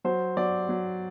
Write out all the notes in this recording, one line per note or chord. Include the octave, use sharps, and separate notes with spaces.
F#3 C5
F#3 D5
F#3